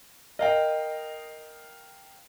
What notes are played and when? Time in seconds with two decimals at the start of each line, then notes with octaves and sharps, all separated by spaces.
0.39 A#4 D#5 F5 G5